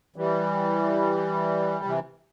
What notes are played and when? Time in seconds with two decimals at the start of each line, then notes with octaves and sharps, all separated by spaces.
0.16 E3 G3
1.85 C3 E3